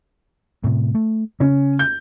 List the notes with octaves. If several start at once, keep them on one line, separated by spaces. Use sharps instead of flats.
A2 C3
A3
C#3 C#4
G6